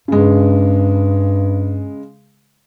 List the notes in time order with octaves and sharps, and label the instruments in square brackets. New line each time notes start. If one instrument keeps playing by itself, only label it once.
[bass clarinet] G2 [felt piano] C#3 G#3